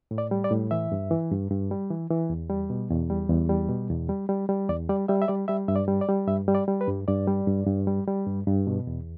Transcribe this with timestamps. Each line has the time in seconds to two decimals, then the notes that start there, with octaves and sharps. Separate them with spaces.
0.11 A2
0.18 D5
0.31 G3
0.44 D5
0.51 A2
0.71 E3 E5
0.92 G2
1.11 E3
1.31 G2
1.51 G2
1.71 G3
1.90 E3
2.10 E3
2.30 E2
2.50 G3
2.70 B2
2.90 E2
3.10 G3
3.30 E2
3.49 G3
3.69 B2
3.90 E2
4.09 G3
4.29 G3
4.49 G3
4.69 E2 D5
4.89 G3 D5
5.08 G3 E5
5.22 E5
5.28 G3 D5
5.48 G3 E5
5.68 G2 E5
5.76 D5
5.88 G3
6.01 D5
6.09 G3
6.28 G2 E5
6.48 G3
6.55 D5
6.68 G3
6.81 B4
6.88 G2
7.08 G2 D5
7.27 G3
7.48 G2
7.67 G2
7.87 G3
8.07 G3
8.27 G2
8.47 G2
8.67 B2
8.87 E2